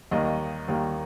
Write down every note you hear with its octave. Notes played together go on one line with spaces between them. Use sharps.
D#2 D#3 G3 A#3 D#5
D#2 D#3 G3 A#3